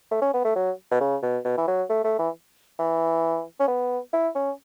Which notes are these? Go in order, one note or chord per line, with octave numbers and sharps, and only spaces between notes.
A3
C#4
B3
A3
F#3
B2
C#3
B2
B2
E3
F#3
A3
A3
E3
E3
C#4
B3
E4
C#4